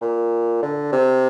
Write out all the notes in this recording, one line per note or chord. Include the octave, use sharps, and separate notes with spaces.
A#2
D3
C3